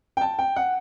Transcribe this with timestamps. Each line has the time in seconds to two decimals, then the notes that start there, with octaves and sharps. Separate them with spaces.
0.17 G5
0.21 A5
0.39 G5
0.56 F#5